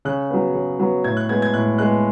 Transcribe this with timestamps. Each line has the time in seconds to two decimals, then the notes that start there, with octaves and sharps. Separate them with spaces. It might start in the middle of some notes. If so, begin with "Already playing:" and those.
0.05 C#3 F#6
0.31 F#3 B3
0.54 C#3
0.79 F#3 B3
1.04 A2 G#6
1.17 F#6
1.29 G#3 B3 G#6
1.42 G#6
1.54 A2 F#6
1.78 G#3 B3 F#6